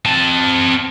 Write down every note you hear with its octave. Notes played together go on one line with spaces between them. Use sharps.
C4 A5